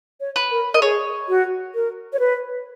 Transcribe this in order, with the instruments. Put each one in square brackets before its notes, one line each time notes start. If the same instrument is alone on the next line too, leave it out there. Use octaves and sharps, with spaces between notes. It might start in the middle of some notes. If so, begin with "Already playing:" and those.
[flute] C#5
[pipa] B4
[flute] A#4
[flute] A#4 [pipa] D#5
[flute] G#4 [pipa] C#5
[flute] F#4
A#4
C#5
B4